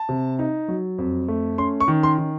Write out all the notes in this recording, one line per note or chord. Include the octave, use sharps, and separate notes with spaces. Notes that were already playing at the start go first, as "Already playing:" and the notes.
Already playing: A5
C3
D#4
F#3
F2
A3
C#4 C6
C#6
D#3
C6
D#3